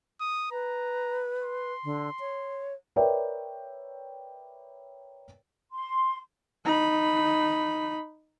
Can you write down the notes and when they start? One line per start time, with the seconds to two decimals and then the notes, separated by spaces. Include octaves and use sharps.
0.21 D#6
0.51 B4 A#5
1.42 C6
1.84 D3
2.20 C#5
2.96 A#4 B4 C#5 D5 E5 G5
5.72 C6
6.65 D#4 B5